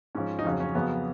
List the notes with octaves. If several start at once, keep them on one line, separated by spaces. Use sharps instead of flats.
G#2 F3 C#4
D#4
F2 C#3 F#3 C#4
C#4
F2 C#3 F#3 B3